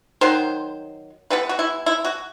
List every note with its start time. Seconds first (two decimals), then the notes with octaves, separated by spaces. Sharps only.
0.21 D#3 F#3 C5
1.30 E3 G3 B3 B4
1.49 F#4
1.59 E4
1.86 E4
2.05 F#4